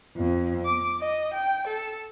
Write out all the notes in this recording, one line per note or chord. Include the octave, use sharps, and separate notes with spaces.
F2
D6
D#5
G5
A4